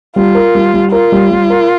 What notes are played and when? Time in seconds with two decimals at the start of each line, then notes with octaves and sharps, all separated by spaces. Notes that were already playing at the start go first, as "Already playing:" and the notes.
0.16 G3 F4
0.35 A#4
0.55 G3
0.74 G3
0.92 F4 A#4
1.12 G3
1.31 G3
1.50 A#4